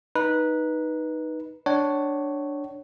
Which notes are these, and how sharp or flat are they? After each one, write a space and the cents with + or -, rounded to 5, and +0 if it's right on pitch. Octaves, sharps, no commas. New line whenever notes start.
D#4 +0 B4 -15
D4 +0 C#5 +0 F#5 +45